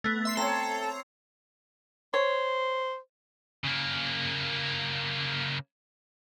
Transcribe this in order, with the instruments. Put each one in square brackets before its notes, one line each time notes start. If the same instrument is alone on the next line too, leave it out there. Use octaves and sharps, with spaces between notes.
[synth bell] A3 B3
E5 C6 C7
[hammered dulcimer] C4 C#5 [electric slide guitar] A4 [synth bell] A#5 C7
[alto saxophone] C5 [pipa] C#5
[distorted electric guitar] C#3 A#3